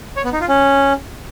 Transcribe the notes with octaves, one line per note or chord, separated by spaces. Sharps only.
C#5
B3
D#4
F4
C#4